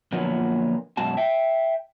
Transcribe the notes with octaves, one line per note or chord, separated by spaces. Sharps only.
A#2 D3 F3 F#3 A#3 B3
F#2 B2 G#3 F#4 A5
E5 G5